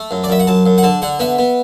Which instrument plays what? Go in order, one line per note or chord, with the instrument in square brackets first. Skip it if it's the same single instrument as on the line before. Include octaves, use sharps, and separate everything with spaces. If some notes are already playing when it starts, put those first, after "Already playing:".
Already playing: [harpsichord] A3
F#2
D5
F#2 E5
F#5
F#2 A5
F#2
F#5
D3 A5
D3 F#5
B3 E5
B3